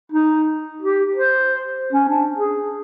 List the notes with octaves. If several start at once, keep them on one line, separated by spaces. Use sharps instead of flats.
D#4
G4
C5
C#4
D4
G#4